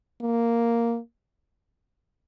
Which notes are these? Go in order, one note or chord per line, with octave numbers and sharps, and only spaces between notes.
A#3